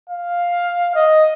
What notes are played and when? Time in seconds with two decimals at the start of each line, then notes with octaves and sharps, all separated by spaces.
0.09 F5
0.95 D#5